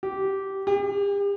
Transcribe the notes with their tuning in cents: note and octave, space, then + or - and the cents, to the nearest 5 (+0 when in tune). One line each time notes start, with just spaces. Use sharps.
G4 -15
G4 +40